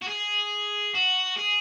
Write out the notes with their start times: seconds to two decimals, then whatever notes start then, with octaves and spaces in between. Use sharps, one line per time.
0.02 F#4
0.08 G#4
0.94 F#4
1.37 G#4